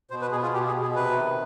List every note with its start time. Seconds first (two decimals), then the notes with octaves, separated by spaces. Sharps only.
0.10 B2 C5
0.21 B4
0.31 B2 G#4
0.42 F4
0.53 B2 G4
0.67 G#4
0.74 B2
0.82 G#4
0.95 C3 B4
1.18 D#3